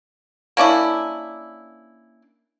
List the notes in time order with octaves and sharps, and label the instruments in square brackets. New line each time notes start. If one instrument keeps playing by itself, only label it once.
[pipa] A#3 C#4 D4 E4